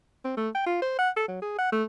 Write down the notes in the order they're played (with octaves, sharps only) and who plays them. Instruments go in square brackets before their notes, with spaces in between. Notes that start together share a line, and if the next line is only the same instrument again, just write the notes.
[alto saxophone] C4
A3
G5
F4
C5
F#5
A4
F#3
G#4
F#5
A3